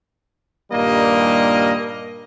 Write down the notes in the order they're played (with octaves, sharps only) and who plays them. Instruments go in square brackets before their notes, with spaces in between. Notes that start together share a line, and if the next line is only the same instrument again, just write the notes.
[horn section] G2 A#2 D#3 G3 A#3 D#5